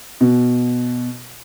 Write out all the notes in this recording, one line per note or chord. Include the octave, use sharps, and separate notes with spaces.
B2